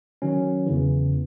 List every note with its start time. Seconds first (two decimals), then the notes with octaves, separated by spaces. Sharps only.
0.22 D#3 F#3 C#4
0.66 E2 C#3 E3